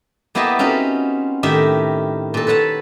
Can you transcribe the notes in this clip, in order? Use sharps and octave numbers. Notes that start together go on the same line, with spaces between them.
A#3 B3 E4 G4 D#5 A5
C4 C#4 D#4 F4 F#4 B4
A2 D#3 G4 E5
A#2 A4
B4 C#5 F#5 A5